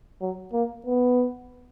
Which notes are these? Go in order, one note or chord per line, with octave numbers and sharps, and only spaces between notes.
F#3
A#3
B3